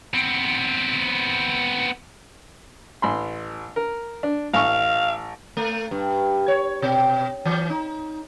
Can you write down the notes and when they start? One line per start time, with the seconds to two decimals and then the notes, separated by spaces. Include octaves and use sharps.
0.14 B3 C4
3.02 A1 B5 C6
3.76 A#4
4.23 D4
4.54 A1 F5 C#6
5.57 A3
5.91 G2
6.48 C#5
6.82 B2
7.45 E3
7.70 D#4